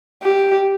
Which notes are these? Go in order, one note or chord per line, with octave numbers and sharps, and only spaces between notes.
G4